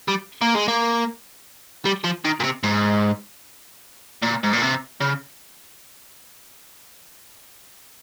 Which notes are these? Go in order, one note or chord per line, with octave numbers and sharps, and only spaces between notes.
G3
A#3
G#3
A#3
G3
F3
D#3
A#2
C3
G#2
A#2
G#2
A#2
C3
C#3